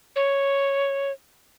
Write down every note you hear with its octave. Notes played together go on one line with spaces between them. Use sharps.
C#5